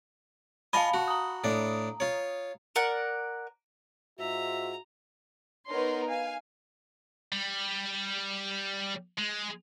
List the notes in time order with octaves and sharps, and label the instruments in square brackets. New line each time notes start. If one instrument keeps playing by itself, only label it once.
[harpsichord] F4 D#5 G#5 [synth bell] F5 A5 B5
[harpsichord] F#4 [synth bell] A5
[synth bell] A#5 D#6
[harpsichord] A2 D4
F4 C#5
[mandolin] A#4 D5 F#5
[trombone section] G#2 F4 [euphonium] F#4 [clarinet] E5 [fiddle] A#5
[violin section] B3 D#4 A#4 C#5 C6
F5 G#5
[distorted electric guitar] G3
G#3